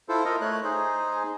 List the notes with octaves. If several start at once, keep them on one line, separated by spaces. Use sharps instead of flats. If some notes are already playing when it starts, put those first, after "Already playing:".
E4 F4 A4 C5
A4 A#4 D#5
A3 C#5 F#6
D#4 G#4 C5